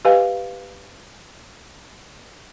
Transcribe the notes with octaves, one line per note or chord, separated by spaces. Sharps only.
G4 B4 D#5 F5 G#5